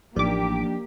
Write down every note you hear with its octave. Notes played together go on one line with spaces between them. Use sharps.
A1 F3 A#3 D4 D#4 G4 D5 D6